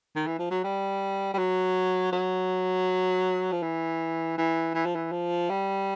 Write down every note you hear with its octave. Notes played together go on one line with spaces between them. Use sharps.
D#3
E3
F3
F#3
G3
G3
F#3
F#3
F3
E3
E3
E3
F3
E3
F3
G3